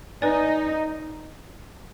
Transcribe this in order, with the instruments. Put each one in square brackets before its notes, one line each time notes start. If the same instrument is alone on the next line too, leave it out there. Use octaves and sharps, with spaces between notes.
[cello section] D#4 [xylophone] B4 D5 G#5